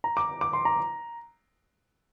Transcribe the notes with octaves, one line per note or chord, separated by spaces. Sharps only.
A#5
D6
D6
C6
A#5